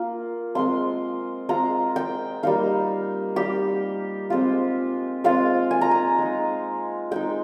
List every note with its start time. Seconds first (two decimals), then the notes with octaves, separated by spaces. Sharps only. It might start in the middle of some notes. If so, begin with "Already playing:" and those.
Already playing: A#3 F4
0.55 G#3 C4 F4 C6
1.49 G#3 C4 F4 A#5
1.96 G5
2.43 G3 A#3 D#4 F5
3.36 G3 A#3 D#4 G4
4.30 G#3 C4 F4
5.24 G#3 C4 F4 F5
5.71 G#5
5.81 A#5
5.91 G#5
6.18 G#3 D#4
7.11 G#3 D#4 G5